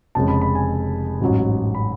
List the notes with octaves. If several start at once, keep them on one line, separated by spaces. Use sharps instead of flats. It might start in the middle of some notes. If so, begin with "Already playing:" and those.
F1 F2 C#3 G#3 A5
B5
B5
G#5
A1 G#2 F#3
B5